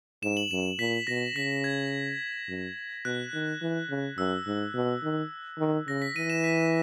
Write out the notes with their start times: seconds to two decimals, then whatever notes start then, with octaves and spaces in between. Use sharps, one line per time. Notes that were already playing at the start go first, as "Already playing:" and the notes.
0.23 G#2 E7
0.37 F#7
0.51 F#2 E7
0.79 A#2 B6
1.07 B2 A#6
1.36 C#3 B6
1.64 G#6
2.48 F#2
3.05 B2 F#6
3.34 D#3
3.62 E3
3.90 C#3
4.18 F#2 E6
4.47 G#2
4.75 B2
5.03 D#3
5.59 D#3
5.88 C#3 A#6
6.02 B6
6.16 E3 D#7
6.30 E7
6.44 B6